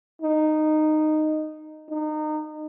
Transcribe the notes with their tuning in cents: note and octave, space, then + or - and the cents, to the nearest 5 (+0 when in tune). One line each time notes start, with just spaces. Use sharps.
D#4 -10
D#4 -25